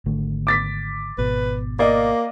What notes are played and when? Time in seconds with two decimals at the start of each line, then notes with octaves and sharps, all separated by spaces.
0.06 G#1 D3 A3
0.47 D6 A6 B6
1.18 G#1 B2 B4
1.79 A#3 D5 D#5 F5